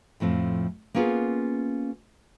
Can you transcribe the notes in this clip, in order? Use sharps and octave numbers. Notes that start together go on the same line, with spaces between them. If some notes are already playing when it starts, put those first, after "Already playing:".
F2 A2 F3 C4
A#3 B3 C#4 F4 G#4